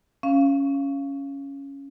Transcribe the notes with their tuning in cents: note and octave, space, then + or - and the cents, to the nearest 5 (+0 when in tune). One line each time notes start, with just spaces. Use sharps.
C#4 +0 F5 -15